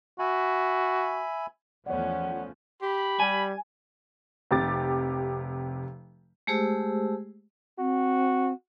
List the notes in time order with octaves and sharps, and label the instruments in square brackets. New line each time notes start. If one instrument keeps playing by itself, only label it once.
[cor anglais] F#4 [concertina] E5 G#5 B5
[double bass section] E2 F3 [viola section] A3 B3 C#4 [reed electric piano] C#5 D5 [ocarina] F#5
[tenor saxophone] G4 [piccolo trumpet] B5
[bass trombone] G3 [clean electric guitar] G#5
[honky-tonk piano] F1 C3 G4 D6 A6
[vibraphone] G#3 A3 G4 G#4 C5 E6
[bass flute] C4 [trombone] F#4